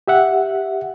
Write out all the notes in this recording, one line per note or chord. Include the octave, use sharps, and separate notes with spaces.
G4 E5 F#5